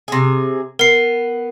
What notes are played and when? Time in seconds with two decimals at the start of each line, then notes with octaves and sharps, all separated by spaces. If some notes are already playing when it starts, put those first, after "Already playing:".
0.08 C3 G#4
0.79 B3 A#4 C7